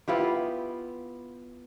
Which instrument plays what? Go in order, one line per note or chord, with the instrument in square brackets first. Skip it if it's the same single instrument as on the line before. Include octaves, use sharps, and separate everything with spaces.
[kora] B3 E4 F4 G4